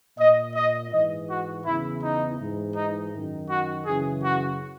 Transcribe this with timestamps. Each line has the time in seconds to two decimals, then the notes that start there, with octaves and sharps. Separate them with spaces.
0.18 A#2 D#5
0.55 D#5
0.91 G#2 E3 D#5
1.29 F#4
1.66 E2 C#3 E3 E4
2.03 D#4
2.39 G#2 E3
2.75 D#4
3.13 F#2 D#3
3.49 F#4
3.86 F#2 C#3 E3 G#4
4.24 F#4